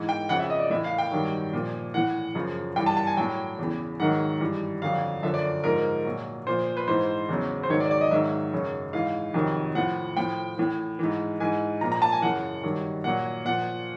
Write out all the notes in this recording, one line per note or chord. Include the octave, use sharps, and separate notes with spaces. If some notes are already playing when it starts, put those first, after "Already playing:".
Already playing: G#2 E3
G5
F2 C#3 F3 F#5
E5
D#5
D5
A2 E3 E5
F5
G5
G2 D#3 F#3
A#2 F3
A2 E3 F#5
F#2 C#3 F3
G2 E3 G5
A5
A5
G#5
A2 F#3 G5
E2 C#3 E3
G#2 D#3 F#3 F#5
G2 E3
F2 D3 F#3 F5
F#2 D3 F3 E5
D5
G#2 F3 A#4
A#2 F#3
A#2 F3 C5
B4
G#2 E3 C5
E2 C#3 F#3
C5
G#2 D#3 F#3 C#5
D5
D5
D#5
G#2 D#3 F#3 E5
F#2 C#3 F#3
G#2 E3 F5
F2 C3 D#3 F#3
A2 F3 F#5
A2 F3 G5
A2 E3
G#2 E3
G#2 E3 G#5
A#2 F3 A#5
A#5
A5
G#5
F#2 C#3 E3 F#5
G2 D#3 F#3
A#2 F#3 F#5
A#2 F3 F#5